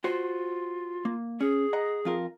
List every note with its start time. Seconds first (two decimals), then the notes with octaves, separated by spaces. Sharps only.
0.04 F4 F#4 C5
1.05 A#3
1.41 C#4 G#4
1.73 D#5 F#5 A#5
2.05 F2 F4 A#4